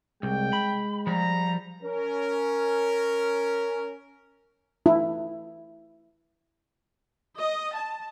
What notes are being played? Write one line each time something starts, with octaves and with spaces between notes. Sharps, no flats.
C2 G#3 G5
B5
F3 G3 A#5
C#4 A#4
E4
D#5
A5